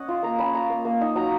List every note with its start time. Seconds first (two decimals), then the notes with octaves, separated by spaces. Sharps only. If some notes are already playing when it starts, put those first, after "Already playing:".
Already playing: C#4 D#5 F#5
0.09 F4
0.23 A#3 A#5
0.39 C#4 B5
0.54 F4 A#5
0.70 A#3
0.85 A#3
1.01 D#4
1.16 F#3 A#5